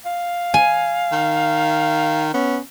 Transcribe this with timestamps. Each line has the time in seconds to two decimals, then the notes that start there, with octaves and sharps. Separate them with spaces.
0.05 F5
0.54 G#5
1.12 D#3
2.34 B3 C#4